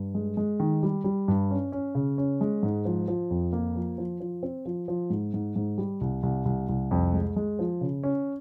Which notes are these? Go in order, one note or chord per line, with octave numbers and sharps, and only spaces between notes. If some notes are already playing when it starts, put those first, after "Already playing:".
Already playing: G2
G#3
G#3
D#3
G3
G3
G2
C#4
C#4
C#3
C#4
G#3
G#2
F3
F3
F2
A#3
F3
F3
F3
C4
F3
F3
G#2
G#2
G#2
G3
C2
C2
C2
C2
F2
G#3
G#3
F3
C#3
C#4